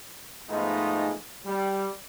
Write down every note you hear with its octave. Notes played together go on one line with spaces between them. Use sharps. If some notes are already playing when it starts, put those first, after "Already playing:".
G#2 F3 G#3 A3 B3 D#4
G3